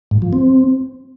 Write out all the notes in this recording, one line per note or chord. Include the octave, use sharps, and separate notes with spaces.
G#2
F3
C4